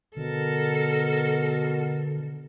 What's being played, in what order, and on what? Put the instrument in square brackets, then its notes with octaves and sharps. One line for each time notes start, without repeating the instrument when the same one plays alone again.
[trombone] B2 [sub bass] D3 [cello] A4 A#4